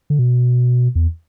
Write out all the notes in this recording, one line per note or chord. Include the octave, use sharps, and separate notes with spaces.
D3
B2
E2